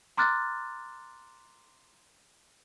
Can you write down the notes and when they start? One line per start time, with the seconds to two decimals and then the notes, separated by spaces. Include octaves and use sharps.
0.17 A#5 C6 D6 F6 F#6 A6